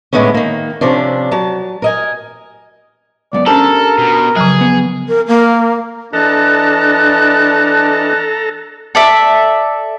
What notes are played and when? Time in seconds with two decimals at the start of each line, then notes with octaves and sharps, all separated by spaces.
0.13 A2 D3 G#3 A3 B3 C#4
0.34 D#3 A#3
0.81 C3 F3 C#4 D4
1.31 F#3 A5
1.82 A#4 D#5 G#5
3.33 C#2 F#2 B3 D5
3.46 C#4 D4 G4 A4 A#4 C5 A5
3.98 B2
4.36 C#3 F3 F#3 G#4
4.61 B3
5.08 A#4
5.28 A#3
6.13 E3 D4 A4 D#5 A5 A#5 F#6
8.95 A4 D5 E5